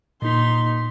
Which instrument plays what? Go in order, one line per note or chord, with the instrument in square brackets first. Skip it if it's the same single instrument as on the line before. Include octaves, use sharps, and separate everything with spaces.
[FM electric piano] A#2 B6 [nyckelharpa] D#4 C6